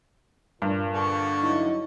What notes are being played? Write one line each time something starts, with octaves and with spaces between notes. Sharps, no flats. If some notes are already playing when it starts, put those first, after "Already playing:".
G2 A#2
D3 A5 C#6
F#3 D#4 E4